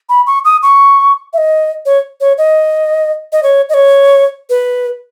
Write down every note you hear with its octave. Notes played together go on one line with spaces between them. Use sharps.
B5
C#6
D#6
C#6
E5
D#5
C#5
C#5
D#5
D#5
C#5
D#5
C#5
B4